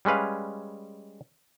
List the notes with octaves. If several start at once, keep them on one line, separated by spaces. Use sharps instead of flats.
G3 G#3 C#4 B4 F5